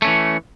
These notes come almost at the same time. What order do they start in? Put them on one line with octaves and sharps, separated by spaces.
A3 C#4 E3